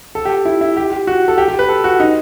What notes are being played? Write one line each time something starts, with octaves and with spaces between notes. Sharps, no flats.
A4
G4
E4
E4
G4
G4
F#4
A4
G4
G4
B4
A4
F#4
D#4